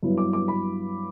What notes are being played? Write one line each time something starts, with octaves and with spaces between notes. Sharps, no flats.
G2 F#3 B3 E4
D6
D6
B5